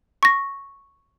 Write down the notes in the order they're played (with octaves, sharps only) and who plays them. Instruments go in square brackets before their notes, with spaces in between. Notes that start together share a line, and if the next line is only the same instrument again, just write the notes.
[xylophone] C#6 A#6